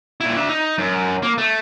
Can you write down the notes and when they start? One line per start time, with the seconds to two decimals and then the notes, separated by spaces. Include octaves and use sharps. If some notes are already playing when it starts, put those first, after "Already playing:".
0.21 A#2 E4
0.37 D4 E5
0.49 D#4
0.78 F#2
1.23 A#3
1.38 A3